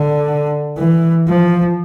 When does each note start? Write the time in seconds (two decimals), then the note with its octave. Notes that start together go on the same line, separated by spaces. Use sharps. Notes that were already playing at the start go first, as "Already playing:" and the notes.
Already playing: D3
0.78 E3
1.28 F3